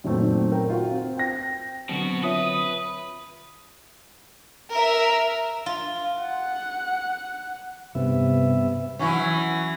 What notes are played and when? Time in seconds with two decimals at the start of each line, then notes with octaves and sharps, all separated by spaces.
0.04 F#2 A#2 D#3 A3 C4
0.52 A#4 G5
0.70 F4 F#4
0.91 C4
1.17 G5 A#6
1.89 B2 D3 F#3 C4 F#4
2.23 F4 B4 C#5 E5 D#6
4.72 A#4 E5
5.66 F4
6.20 F#5
7.95 G2 C3 B3 E5
8.99 E3 F#3 C#4